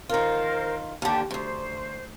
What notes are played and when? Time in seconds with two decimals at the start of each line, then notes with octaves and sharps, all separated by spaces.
0.09 D#3 F4 A#4 C5
1.02 D#2 D3 G4 A5
1.31 D2 G2 C5